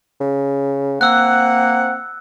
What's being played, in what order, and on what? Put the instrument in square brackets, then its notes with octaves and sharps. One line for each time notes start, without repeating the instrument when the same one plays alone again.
[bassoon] C#3
[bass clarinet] A#3 [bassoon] C4 [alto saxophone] F#5 [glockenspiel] E6 F#6